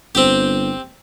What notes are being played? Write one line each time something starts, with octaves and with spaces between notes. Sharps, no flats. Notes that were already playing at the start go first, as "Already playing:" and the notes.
G1 C4 G4